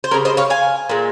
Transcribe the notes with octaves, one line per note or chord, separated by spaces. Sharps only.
C5
C#3 G3 A#4 C#5
C5 D#5
C#5 F5
F5 G#5
A#2 G#3